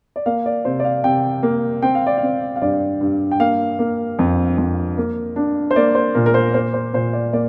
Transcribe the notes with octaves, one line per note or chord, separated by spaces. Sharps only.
D5
A#3 F5
D5
C3 C5
D5
F5
C3 G5
A#3
C4 G5
F5
D5
C4 F5
F5
G2 D5
G2
G5
A#3 F5
A#3
F2
F2
A#3
D4
C5
A#3 D5
C5
A#2 A#4
A#4
C5
A#3 C5
C5
A#2 C5
D5
A#3 D5